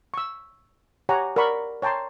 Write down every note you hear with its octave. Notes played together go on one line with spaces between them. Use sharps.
C#6 E6
G4 C#5 F#5 G#5 A#5
A#4 D5 F#5 B5 C#6
C#5 G5 A5 A#5 C6